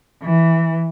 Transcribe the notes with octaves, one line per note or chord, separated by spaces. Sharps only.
E3